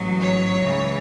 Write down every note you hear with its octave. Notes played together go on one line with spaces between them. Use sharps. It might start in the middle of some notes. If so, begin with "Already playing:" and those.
Already playing: A1 G#2 F#3
C#5
C#2 C#3 E3